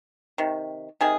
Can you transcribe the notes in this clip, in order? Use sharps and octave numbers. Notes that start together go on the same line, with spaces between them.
C3 D#3
C3 D#3 G#4